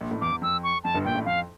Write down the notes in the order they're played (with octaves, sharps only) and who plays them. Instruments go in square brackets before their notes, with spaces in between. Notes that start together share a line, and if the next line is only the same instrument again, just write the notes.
[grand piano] A#1 A#2
A1 A2
[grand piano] E2 [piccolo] D6
[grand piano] E2
[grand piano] F2 [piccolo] E6
[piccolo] C#6
[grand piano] F2 [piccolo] A5
[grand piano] G1 G2
[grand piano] A#1 A#2 [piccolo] G5
[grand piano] A1 A2
[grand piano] F2 [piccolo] F5